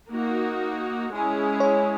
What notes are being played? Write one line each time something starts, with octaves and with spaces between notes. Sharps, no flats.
A#3 D#4 F#4
G#3 C#4 E4 G#4
C#5